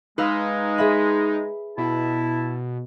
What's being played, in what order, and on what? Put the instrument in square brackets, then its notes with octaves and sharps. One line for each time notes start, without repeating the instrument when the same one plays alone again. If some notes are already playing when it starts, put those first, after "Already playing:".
[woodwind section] G#3 [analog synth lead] D#4 [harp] B4 F5 E6
[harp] G#4 E5 B5
[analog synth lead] B2 [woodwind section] E4 A5